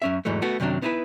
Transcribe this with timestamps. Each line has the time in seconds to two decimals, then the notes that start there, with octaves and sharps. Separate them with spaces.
0.02 F#2 C#4 E5
0.25 E2 G#2 E3 F#3 A3
0.42 A3 B3 F#4
0.60 F#2 C3 D#3 F#3 D4
0.82 B3 D#4 E4 A4 B4